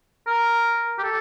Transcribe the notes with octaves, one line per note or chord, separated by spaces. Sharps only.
A#4
G4
A4